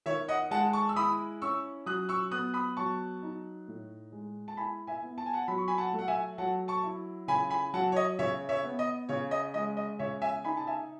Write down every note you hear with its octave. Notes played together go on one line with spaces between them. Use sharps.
D#3 C#5 E5
D#5 F#5
G#3 F#5 A5
A5 C#6
E6
E4 B5 D#6
C#4 C#6 E6
F#3 D#6 F#6
C#6 E6
B3 D#6 F#6
B5 D#6
F#3 A5 C#6
D#4
A2
G#3
A5
E4 G#5 B5
E5 G#5
B3
A5
G#5
F#5 A5
F#3 B5
C#6
G#5 B5
F#5 A5
A3
F#5
E5 G#5
F#3 F#5 A5
A5 C#6
E4
C#3 G#5 B5
G#5 B5
F#3 F#5 A5
C#5
D#5
C#3 C#5 E5
C#5 E5
B3
D#5
C#3 C#5
D#5
G#3 D#5
D#5
C#3 C#5 E5
E5 G#5
D#4 G#5 B5
A5
E5 G#5